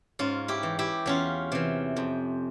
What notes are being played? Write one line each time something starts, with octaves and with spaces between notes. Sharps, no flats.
G#2 C#4 F4
E4 G4
E3
E4 G4
E2 C#4 F4
C3 E3
F2